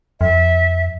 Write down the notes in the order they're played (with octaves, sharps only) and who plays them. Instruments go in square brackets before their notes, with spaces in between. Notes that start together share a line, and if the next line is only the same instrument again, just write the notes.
[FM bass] F2 [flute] E5